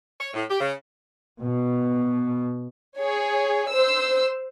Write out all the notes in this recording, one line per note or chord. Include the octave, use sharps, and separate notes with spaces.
C#5
A2
G4
C#3
B2
G#4 C#5
C5 E6